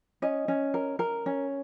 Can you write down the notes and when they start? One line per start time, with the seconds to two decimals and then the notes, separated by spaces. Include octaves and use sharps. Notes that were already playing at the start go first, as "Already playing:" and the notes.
0.22 C#4 D#5
0.48 C#4
0.74 A#4
0.99 A#4
1.26 C#4